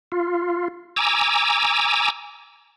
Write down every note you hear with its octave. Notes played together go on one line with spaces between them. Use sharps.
F4
G#5 A#5 D6 E6